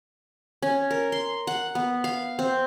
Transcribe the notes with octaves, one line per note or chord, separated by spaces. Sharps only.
C#4
A#4
C6
F#5
B3
F5
C4